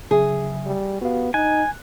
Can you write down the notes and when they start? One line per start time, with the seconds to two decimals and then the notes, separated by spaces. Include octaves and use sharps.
0.11 C#3 F#3 G#4 E5
0.66 G3
1.01 B3 F#4 G4 F5
1.34 D#4 G#5 F#6